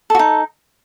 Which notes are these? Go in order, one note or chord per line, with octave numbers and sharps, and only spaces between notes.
D#4 F#4 A4